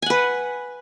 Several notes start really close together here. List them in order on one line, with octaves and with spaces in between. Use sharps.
G#5 F#5 B4